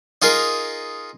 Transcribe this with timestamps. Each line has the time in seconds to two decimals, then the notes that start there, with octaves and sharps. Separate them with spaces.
0.22 D#4 F4 G#4 A#4